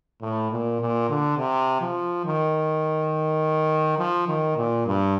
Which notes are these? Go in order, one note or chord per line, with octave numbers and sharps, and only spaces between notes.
A2
A#2
A#2
D3
C3
F3
D#3
F3
D#3
A#2
G2